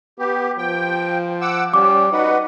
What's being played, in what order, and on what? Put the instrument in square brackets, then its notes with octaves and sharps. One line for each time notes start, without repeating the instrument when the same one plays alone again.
[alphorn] B3 [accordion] G4
[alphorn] F3 [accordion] G5
[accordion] F#5 D6 E6
[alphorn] G3 [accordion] C#4 [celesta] D6
[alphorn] D#4 [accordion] F#4 B4 F#5